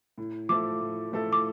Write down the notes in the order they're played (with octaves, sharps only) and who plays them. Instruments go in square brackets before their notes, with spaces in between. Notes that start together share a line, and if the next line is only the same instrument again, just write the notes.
[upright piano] A2
[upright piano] F3 A3 E4 A4 [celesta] D6
[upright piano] A2
F3 A3 E4 A4
[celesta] D6